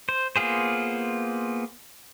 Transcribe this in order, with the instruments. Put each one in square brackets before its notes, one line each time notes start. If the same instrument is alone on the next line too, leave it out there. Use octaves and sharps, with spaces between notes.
[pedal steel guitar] C5
A#3 B3 F4 G#4 C5